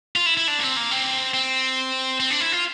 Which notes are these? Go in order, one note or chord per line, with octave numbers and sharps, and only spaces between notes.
F4
E4
E4
D4
A#3
C4
A#3
C4
C4
C4
D4
E4
F4